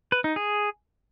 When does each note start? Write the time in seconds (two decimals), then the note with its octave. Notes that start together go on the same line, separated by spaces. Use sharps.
0.12 B4
0.24 D#4
0.36 G#4